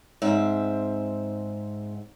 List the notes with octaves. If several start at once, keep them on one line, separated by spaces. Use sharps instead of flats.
G#2 C4 E5